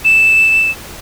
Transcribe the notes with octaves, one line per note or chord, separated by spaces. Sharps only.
E7